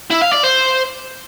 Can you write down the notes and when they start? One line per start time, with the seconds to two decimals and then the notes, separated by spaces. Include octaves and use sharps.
0.10 E4
0.21 F5
0.32 D5
0.43 C5